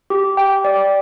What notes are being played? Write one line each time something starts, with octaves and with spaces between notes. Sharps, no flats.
G4
G5
D5